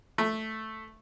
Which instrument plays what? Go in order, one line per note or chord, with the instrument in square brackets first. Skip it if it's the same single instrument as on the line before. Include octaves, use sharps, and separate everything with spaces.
[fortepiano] A3